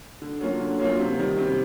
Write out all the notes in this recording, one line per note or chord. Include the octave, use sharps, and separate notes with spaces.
D3
F#3 A#3 C#4 F4
D3
F#3 A#3 C#4 F4
C3
D#3 G3
C3